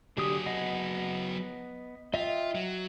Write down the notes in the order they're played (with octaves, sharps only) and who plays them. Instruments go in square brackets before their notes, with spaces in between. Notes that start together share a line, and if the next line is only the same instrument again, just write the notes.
[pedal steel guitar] D3 G4 D#6 [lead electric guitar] F#3 G#4
[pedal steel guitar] B3 D#5 F#5
[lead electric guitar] F4 [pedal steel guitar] D#5 E5 G5
[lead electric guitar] F#3